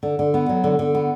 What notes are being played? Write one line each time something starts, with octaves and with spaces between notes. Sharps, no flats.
D3
D3
B3
F#3
D3
D3
B3